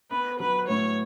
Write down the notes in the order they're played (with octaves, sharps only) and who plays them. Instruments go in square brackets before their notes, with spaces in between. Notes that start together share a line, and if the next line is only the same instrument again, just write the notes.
[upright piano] B3 [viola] B4
[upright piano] F#3 [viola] B4
[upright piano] A2 [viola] C#5